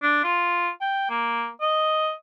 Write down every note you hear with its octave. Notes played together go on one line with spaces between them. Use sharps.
D4
F4
G5
A#3
D#5